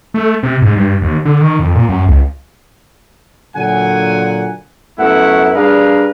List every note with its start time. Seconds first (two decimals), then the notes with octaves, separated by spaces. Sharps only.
0.14 A3
0.43 C3
0.62 G#2
0.77 G2
1.01 D#2
1.25 D3
1.41 D#3
1.59 F2
1.75 A#2
1.89 F#2
2.08 C#2
3.55 A#2 D3 F#3 F#5 G#5
4.99 F#2 A3 B3 E4 F#5
5.55 G3 D4 G#4 A#4 B4 F5